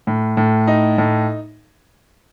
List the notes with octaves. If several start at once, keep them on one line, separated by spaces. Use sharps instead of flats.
A2
A2
D#4
A2